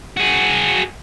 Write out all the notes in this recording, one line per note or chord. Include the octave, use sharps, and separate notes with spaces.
F#4 G#4